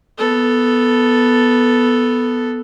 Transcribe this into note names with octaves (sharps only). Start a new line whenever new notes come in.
B3 A4